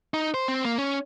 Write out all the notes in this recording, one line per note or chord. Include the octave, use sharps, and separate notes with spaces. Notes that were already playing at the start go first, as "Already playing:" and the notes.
D#4
C5
C4
A#3
C#4